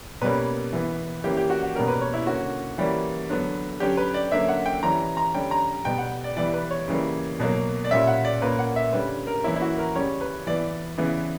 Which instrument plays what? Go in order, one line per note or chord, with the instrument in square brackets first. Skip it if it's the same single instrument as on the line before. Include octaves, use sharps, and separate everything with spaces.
[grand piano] B2 G3 A#3 C#4 B4
E3 B3
E3 A#3 C#4 G4
G4
F#4
F#4
B2 G3 A#3 C#4 A#4
B4
C#5
E4
D3 A#3 C#4 F#4
E3 G3 A#3 C#4
D3 F#3 B3
D3 F#3 C#4 G4
B4
D5
D3 F#3 A#3 C#4 E5
F#5
G5
E3 G3 C#4 A#5
A#5
D3 G3 C#4 G5
A#5
B2 G3 B3 G5
F#5
D5
E3 G3 B3 D5
B4
C#5
C#3 E3 G3 A#3
B2 F#3 A#3
D5
A#2 G3 C#4 E5
F#5
D5
A#2 A#3 C#4 B4
F#5
E5
D3 G3 C#4 B4
A#4
E3 A#3 C#4 E4
E4
F#4
A#4
C#3 G3 C#4 C#5
B4
E3 B3 D5
C#3 E3 B3